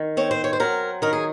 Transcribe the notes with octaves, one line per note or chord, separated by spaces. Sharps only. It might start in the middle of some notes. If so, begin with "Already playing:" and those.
Already playing: D#3
C4 C#5
C5
C#5
C5
F#3 A#4
D#3 A#4
G#4